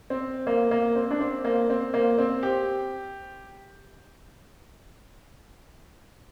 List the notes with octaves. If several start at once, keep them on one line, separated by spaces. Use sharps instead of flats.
C4
A#3
A#3
C4
D4
C4
A#3
C4
A#3
C4
G4